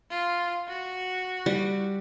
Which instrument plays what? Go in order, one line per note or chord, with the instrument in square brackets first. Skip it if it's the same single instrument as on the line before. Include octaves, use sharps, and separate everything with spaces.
[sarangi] F4
F#4
[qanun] G3